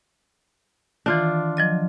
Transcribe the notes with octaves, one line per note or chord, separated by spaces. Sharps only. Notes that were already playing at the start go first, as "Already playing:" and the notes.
D#3 E3 D4 F4
F3 F#3 D#5